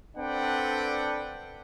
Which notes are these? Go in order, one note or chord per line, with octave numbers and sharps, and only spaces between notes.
C4 D4 A4 B4 F#5 G5